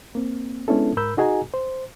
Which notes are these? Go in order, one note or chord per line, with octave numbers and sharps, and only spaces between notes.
A#3 C4
G#3 B3 C#4 D4 E4 A4
G#2 A#4 B5 E6 G6
D#4 F#4 G#4 D#5 G#5 A#5
C5